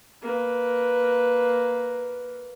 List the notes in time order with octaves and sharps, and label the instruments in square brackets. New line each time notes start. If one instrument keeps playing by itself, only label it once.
[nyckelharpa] A#3 B4